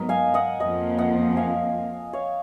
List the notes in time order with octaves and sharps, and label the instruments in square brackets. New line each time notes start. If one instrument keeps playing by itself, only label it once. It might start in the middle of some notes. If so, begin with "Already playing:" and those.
Already playing: [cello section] G#2 F#3 B3 [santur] A#4 D#5
[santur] F5 G#5
D#5 F#5
[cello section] F2 F3 A#3 [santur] D#5 F#5
[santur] D#5 F#5
F5 G#5
C#5 F5